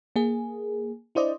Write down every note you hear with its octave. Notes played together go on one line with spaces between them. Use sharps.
A#3 G#4
D4 E4 C5 D5 D#5